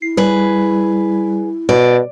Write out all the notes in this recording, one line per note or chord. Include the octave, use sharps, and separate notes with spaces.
E4 C7
G3 G#4 B4
B2 D5